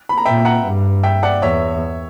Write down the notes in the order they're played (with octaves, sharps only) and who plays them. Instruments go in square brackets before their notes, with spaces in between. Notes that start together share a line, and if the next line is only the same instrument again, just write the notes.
[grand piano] B5
A#5
[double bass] A#2 [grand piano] E5 G5
[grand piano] F#5 A#5
[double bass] G2
[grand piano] E5 G5
D5 F#5
[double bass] E2 [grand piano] C#5 E5